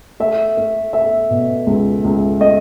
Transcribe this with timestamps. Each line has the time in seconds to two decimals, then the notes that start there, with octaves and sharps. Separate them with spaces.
0.20 A3 E5
0.57 A3
0.93 A3 E5
1.30 B2
1.67 C#2
2.04 C#2
2.40 A3 D#5